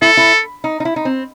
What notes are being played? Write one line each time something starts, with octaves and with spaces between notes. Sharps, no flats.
E4 A4
E4
D#4
D#4
E4
D#4
C4